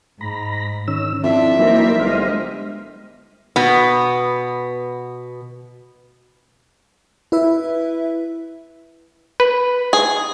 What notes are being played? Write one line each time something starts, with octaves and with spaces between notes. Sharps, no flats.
G#2 A#5 B5
D#3 C#4 E6
F2 D4 E4 E5
E3 F#3 A#3 D#4 A#4 C5 D5
G1 G#3 G4 C5 D#5 F5
B2 B3
E4 B4 E5
B4
G#4